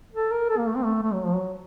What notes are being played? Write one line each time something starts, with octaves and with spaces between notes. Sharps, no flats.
A4
A#4
A4
A#3
A3
C4
A3
A3
F#3
F3
F#3